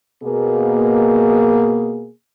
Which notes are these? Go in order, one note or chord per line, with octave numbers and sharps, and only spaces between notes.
B2 A#3 G#4